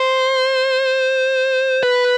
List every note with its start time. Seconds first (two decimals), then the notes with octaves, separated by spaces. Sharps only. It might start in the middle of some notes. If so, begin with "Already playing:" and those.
Already playing: C5
1.83 B4